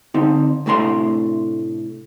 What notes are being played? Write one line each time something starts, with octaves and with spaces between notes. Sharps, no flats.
D3 C4 D#4
A2 C3 A3 D4 A#5 C6